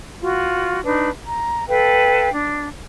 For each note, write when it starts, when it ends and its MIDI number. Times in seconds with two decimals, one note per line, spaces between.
0.20 0.83 65
0.20 0.83 66
0.83 1.09 62
0.83 1.09 63
0.83 1.09 71
1.25 1.66 82
1.67 2.30 69
1.67 2.30 71
1.67 2.30 77
1.67 2.30 79
2.33 2.68 62